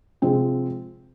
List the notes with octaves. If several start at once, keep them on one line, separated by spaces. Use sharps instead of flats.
C3 F3 G#3 C4